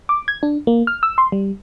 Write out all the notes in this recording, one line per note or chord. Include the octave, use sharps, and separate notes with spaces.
D6
G#6
D4
A#3
F6
E6
C6
G3